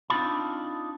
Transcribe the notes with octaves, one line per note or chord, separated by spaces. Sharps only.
C4 D4 D#4 F4 A5 B5